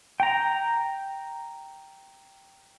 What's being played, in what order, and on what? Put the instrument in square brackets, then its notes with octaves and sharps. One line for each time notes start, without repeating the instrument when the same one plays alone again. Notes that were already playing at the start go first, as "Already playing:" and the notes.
[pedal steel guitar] G5 A#5